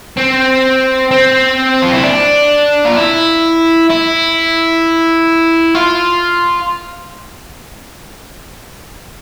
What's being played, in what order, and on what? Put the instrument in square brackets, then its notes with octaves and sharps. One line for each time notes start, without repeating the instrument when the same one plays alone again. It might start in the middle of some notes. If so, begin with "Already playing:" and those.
[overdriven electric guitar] C4
C4
F4
E4
D4
F4
E4
E4
F4